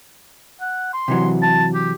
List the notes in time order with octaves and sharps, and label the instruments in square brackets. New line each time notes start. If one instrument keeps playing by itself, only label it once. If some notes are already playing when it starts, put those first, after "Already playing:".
[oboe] F#5
C6
[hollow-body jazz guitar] C3 E3 F#3
[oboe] A5
G4